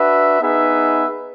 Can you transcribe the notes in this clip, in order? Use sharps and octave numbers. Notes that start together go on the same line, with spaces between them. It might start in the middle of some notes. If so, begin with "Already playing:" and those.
Already playing: D4 F#4 B4 E5
B3 D#4 G#4 B4 E5